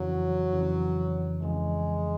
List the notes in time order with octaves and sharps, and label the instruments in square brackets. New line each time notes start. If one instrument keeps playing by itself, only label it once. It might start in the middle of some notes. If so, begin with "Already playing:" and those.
Already playing: [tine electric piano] F2 C#3 E3 [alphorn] F#3
[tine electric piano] F2 C#3 E3
[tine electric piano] F2 C#3 E3 [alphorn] G#3